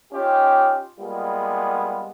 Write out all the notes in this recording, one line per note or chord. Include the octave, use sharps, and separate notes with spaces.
C#4 D#4 F4 G4
G3 G#3 A#3 B3 F4 G#4